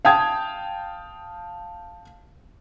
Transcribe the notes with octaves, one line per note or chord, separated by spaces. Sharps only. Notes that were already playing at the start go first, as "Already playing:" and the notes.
F5 G5 A5 D#6 G#6